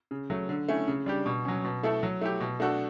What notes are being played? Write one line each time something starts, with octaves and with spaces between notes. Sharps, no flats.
C#3
F#3 A3
D3
A3 C#4 E4
C#3
G3 D4 G4
B2
F#3 C#4
B2
A3 E4 A4
F#3
A3 E4 G4
B2
A3 D4 F#4 A4